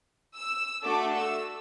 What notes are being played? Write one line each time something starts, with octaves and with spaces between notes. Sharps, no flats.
E6
A3 D4 F#4 A4 D6
E6